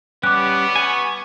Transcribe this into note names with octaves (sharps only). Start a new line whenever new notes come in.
G3 B3 C#4 G4 D6 F#6
G#5 C#6